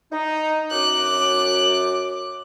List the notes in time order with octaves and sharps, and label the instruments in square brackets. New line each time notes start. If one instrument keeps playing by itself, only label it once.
[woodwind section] D#4
[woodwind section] F#2 D6 [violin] F#6